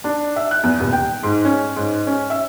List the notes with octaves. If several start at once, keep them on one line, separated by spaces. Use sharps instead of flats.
D4
E5
F#6
E2
D#1
G5
G#2
C#4
G#2
C#4
E5